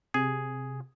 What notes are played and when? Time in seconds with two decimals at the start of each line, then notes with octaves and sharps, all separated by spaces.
0.14 C3 G#4